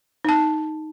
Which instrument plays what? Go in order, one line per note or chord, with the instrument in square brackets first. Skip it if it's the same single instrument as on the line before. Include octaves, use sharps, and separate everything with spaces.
[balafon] D#4 A5